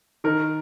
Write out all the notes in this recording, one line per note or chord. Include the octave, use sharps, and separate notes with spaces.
D#3 A#4